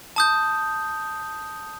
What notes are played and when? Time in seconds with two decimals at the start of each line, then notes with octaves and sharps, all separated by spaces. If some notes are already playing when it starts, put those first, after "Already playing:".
0.16 A5 D#6 G6